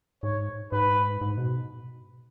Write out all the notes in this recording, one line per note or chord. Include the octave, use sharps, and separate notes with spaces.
G#2 C#5
G#2 B4
G#2
B2